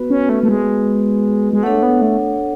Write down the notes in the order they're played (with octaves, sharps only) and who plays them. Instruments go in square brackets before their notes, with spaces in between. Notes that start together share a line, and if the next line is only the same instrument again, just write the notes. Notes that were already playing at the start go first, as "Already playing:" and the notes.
Already playing: [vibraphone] B3 F#4 B4
[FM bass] C#4
A3
A3
G#3
G#3
[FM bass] A3 [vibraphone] D4 A4 C#5 F#5
[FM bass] B3
A3